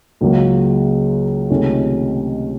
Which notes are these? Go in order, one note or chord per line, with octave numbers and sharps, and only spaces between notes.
C#2 C#3 F#3 A#3
C#2 C3 D#3 A3 C#4